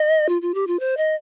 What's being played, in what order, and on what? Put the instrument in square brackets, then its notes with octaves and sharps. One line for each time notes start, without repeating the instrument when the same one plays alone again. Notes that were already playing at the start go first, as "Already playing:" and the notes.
Already playing: [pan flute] D#5
F4
F4
G4
F4
C5
D#5